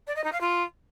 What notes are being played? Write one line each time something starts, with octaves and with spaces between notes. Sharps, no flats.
D5
D#5
D#4
F5
F4